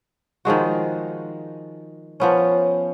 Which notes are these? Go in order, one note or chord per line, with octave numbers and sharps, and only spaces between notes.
D#3 F3 G#3 F#4
F3 B3 C#4